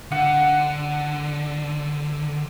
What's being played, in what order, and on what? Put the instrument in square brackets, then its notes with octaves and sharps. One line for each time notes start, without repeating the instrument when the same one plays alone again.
[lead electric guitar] D3 [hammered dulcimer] F#5